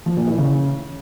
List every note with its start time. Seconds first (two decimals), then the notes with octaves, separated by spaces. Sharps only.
0.06 F3
0.17 A#2
0.27 E3
0.38 C#3